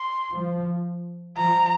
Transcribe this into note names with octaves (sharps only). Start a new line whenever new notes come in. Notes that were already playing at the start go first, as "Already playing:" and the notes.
Already playing: C6
F3
F3 A#5